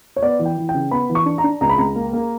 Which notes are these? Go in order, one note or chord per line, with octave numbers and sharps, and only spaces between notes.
C#5
B3 D5
E3
G5
E3
G5
C#3
B3 B5
E3
C#6
D4
A#5
D4
C#2 A#5
B5
C#2 A#5
A#3
A#3